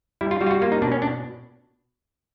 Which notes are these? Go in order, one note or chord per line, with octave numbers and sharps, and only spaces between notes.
G3 E4
F4
G3 F#4
F4
F#4
A#3 F4
D#4
B2 D4
C#4
D4